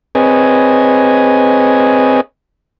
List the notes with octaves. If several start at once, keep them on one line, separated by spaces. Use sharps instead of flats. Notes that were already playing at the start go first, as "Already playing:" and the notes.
C4 G#4 B4 C#5 D#5 G#5